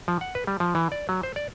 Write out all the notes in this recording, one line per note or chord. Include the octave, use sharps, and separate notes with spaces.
F3
F#5
B4
G3
F3
E3
D5
F#3
C5
D5